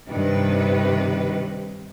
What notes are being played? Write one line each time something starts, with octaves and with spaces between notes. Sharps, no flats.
G2 C3 D#3 B4